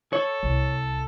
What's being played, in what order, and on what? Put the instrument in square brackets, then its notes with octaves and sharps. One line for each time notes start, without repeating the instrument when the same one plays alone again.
[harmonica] A4 [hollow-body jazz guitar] C#5
[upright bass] C2